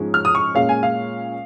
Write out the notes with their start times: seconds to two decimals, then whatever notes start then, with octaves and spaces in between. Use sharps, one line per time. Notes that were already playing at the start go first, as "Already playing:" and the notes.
Already playing: G#2 F3 G#3 C#4
0.14 F6
0.25 D#6
0.35 C#6
0.54 A#2 G#3 C#4 F5
0.69 G#5
0.83 F5